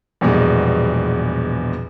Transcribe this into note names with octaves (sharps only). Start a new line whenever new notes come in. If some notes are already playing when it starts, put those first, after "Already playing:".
A#1 E2 B2 G3 G#3